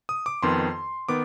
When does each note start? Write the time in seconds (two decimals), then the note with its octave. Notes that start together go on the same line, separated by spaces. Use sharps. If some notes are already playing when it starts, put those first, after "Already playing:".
0.09 D#6
0.26 D6
0.43 F2 D#3 B3 C6
1.09 D#3 B3 D6